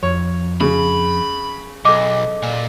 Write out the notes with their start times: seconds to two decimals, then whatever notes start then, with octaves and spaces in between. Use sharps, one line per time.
0.03 F2 C#5
0.61 C#3 B5
1.85 B1 A4 D#5 D6
2.43 A#2